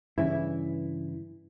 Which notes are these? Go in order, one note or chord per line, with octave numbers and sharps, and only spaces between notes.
G2 C#3 E3 E4